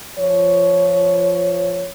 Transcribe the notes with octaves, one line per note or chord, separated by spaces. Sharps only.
F3 C#5